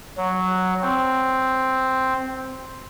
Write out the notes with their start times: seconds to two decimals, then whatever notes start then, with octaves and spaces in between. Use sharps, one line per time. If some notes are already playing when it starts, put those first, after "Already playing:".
0.17 F#3
0.82 C4